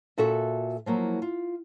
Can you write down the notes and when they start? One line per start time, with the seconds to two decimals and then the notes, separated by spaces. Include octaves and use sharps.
0.18 A#2 F#4 A4 E5
0.86 F3 F#3 A#3 E4
1.22 F4